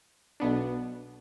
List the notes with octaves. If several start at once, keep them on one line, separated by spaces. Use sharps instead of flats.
B1 B2 B3 D4